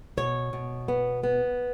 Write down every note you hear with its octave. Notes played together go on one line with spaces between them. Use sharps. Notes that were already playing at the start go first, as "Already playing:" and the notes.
B2 C#5
B2
B3
B3